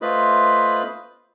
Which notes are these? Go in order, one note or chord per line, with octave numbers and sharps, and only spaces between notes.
A3 F4 B4 C5 D#5 B5